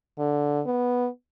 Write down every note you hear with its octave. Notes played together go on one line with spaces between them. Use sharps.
D3
B3